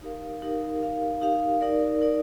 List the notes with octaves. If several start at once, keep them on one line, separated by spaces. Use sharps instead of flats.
D#4 G4 A#4 F5
D#4 G4 A#4 F5
D#4 G4 A#4 F5
D#4 G4 A#4 F5
D#4 A#4 D5
D#4 A#4 D5